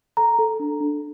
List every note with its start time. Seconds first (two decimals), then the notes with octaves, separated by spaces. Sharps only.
0.17 A4 A#5
0.39 A4
0.60 D4
0.80 D4